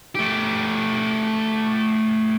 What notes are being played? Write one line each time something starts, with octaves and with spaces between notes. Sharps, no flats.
A3 G4